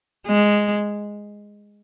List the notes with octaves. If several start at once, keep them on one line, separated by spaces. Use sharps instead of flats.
G#3